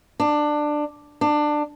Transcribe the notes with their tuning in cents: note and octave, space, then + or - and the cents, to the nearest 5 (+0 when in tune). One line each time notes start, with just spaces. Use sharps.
D4 +15
D4 +20